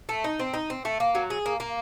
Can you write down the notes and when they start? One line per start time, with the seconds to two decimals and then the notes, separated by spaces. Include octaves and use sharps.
0.09 A3
0.24 D#4
0.39 C4
0.54 D#4
0.70 C4
0.85 A3
1.00 A#3
1.15 F#3
1.30 G#4
1.46 A#3
1.60 A#3